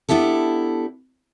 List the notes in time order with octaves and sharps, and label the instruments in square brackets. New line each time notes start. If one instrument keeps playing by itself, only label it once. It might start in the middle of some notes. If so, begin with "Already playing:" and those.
[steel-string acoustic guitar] B3 D4 E4 G4 A4